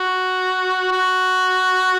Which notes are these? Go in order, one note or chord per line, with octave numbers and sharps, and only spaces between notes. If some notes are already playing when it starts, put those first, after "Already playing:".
Already playing: F#4
F#4